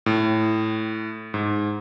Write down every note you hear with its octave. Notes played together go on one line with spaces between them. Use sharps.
A2
G#2